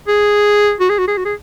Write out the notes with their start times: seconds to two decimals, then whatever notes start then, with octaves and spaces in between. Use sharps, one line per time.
0.07 G#4
0.80 F#4
0.89 G#4
0.98 F#4
1.07 G#4
1.17 F#4
1.25 G#4